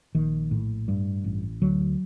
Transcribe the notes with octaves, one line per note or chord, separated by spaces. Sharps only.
A#1 D#3
A2
G2
A1
D2 F#3